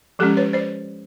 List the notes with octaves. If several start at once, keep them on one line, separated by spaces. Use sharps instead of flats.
F3 G#3 C#4 G4 A4
B4 C#5
C5 D5